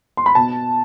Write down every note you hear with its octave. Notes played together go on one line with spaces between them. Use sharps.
C6
B5
B2 A5